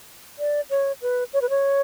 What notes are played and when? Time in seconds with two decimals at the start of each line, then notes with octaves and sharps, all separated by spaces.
0.39 D5
0.70 C#5
1.02 B4
1.33 C#5
1.42 B4
1.50 C#5